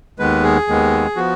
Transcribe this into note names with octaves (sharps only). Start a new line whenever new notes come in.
D#2 D#3 G#3 B3 B4
G#4
D#2 D#3 G#3 B3
F3 B3 F#4